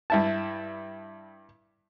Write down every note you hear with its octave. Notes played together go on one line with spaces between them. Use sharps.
G2 E4 A5